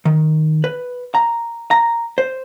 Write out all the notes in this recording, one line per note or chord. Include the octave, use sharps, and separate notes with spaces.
D#3
B4
A#5
A#5
C5